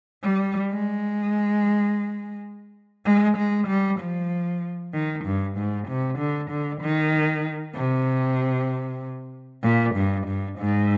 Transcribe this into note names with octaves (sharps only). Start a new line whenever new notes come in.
G3
G#3
G#3
G#3
G3
F3
D#3
G2
G#2
C3
D3
D3
D#3
C3
A#2
G2
G2
G#2